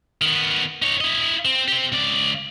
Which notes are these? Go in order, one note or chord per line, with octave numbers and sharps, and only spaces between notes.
D#3 B3
D#4 C#5
E4 D#5
C4
C4 G4
C#2 D5